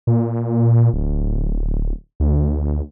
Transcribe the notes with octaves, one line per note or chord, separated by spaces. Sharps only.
A#2
D1
D2